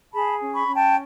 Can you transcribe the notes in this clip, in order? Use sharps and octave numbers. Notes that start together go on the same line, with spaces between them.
G#4 A5 B5
C#4
B5 C#6
C#4
G5 A5